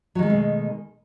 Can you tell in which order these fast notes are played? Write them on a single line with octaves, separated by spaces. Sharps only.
F#3 D#3 G#3 A3 B2